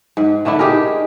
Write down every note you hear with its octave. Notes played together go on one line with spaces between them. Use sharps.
G#2
D3 A3 D4 E4
D#4 G4 G#4 A#4